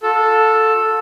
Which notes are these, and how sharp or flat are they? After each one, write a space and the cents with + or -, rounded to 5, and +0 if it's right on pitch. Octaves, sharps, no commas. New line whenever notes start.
F4 +45 A4 +0